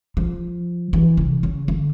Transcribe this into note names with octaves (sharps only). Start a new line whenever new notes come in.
F3
E3
C3
C#3
D3